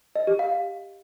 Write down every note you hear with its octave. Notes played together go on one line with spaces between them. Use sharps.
D#5
G4
F5